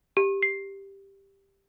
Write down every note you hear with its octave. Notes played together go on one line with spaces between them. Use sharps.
G4
C7